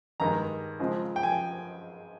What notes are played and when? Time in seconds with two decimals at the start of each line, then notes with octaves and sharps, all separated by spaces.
0.20 G2 D#3 G#3 A#5
0.79 C#3 F3 G#3 C4
1.16 G5
1.23 G#5